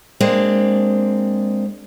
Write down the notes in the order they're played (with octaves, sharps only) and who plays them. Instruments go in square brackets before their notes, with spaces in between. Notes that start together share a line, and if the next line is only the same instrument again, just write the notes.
[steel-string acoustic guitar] G#3 A#3 C4 D4